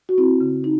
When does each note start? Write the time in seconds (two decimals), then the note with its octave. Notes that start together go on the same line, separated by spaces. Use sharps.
0.09 F#4
0.18 C4 E4
0.41 C#3
0.64 D#4